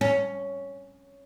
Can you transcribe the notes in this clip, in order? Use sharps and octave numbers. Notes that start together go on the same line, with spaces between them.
C#4